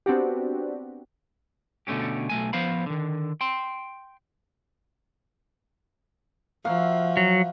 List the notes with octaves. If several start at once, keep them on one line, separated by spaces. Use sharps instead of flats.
B3 C4 D4 F#4 G4
B2 D3 A3 C#4 G4
B1 A3 G#5
F3 B3 C5 F5 B5
D3 D#3
G5 C6
F3 F#4 A#4 E5 F5
F#3